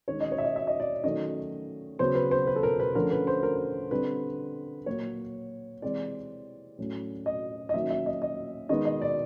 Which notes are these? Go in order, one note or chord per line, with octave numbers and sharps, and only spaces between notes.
D#3 G#3 C#4 C#5
D#5
C#5
E5
D#5
E5
D#5
D5
D#3 F#3 A3 C#4 D#5
C#3 F#3 B3 C5
B4
C5
B4
A4
A#4
B4
D3 F3 A3 C#4 A#4
B4
C5
A#4
D3 G3 C4 B4
A#2 F#3 A#3 C#5
C3 E3 G#3 C4 D5
A2 F#3 A3 C#4
D#5
D#5
D#3 F#3 A#3 C#4 E5
E5
D#5
D#5
D#3 G#3 B3 D#5
D#5
D5